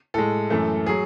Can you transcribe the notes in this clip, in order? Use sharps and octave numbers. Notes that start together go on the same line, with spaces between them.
A2 G#3 A4
F#2 E3 A3
F#3 G#4